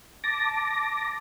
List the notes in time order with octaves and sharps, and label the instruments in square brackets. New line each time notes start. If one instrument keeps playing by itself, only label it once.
[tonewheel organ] A5 D6 A#6